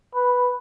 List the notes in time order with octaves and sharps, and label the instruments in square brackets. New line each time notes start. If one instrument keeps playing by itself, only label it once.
[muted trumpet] B4